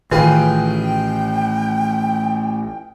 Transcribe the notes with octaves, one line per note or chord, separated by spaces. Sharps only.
A1 D#3 F4 G#4 B4 G5